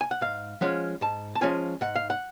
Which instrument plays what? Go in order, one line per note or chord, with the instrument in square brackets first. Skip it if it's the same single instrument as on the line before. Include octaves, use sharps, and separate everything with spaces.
[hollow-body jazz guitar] G#5
F#5
G#2 F5
F3 G#3 C#4 F4 F#5
G#2 A5
A5
F3 G#3 C#4 F4 G#5
G#2 F#5
F5
F#5